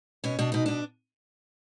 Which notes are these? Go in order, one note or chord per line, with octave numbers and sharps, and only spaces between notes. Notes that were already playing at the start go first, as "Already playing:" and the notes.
B2 C#4
B2 D4
B2 D#4
B2 D4